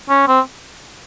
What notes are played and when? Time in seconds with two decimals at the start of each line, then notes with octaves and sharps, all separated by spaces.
0.09 C#4
0.28 C4